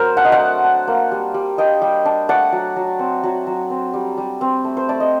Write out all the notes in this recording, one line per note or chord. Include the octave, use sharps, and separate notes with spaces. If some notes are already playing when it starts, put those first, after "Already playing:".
Already playing: F#3 C4 A#4 C5
D4 F#5
D#5
D5 F#5
A3
D4
A#3
G3
G3
D4 D#5 G5
G3
D4
A3 D5 F#5
F#3
F#3
C4
F#3
F#3
C4
G3
G3
C4
A3
C5
A3 D5
D#5